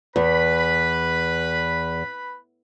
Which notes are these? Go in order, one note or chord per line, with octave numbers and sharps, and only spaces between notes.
E2 B4 B5